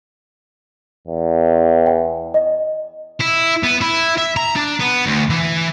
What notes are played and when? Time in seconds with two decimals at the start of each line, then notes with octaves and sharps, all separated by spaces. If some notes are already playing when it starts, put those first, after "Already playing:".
1.08 E2
1.86 G5
2.34 D#5
3.21 E4
3.63 B3
3.81 E4
4.18 E5
4.37 A#5
4.56 D4
4.80 B3
5.06 D2
5.30 E3